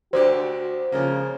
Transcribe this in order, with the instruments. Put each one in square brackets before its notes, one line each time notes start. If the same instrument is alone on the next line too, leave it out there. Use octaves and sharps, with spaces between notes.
[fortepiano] D2 D3 G4 [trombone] F#4 [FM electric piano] C5
[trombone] C#3 [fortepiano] F3 G#3 A#3